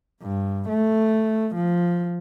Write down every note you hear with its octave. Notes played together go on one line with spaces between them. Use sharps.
G2
A3
F3